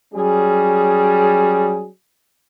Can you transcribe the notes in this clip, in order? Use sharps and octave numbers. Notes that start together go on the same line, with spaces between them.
F#3 G3 C#4 G#4